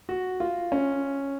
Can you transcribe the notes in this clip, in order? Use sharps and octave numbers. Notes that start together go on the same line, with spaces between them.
F#4
F4
C#4